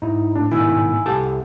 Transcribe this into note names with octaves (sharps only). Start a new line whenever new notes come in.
G#2 D#4 E4
A2 D4
G#2 B2 D#3 E4 G#5 E6
C2 G4 A4 F#5 A5